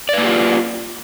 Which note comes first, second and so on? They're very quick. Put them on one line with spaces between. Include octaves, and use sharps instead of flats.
D5 B4 A#3 G4 F4